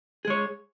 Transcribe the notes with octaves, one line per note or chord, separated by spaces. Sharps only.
G#3 G#4 C#5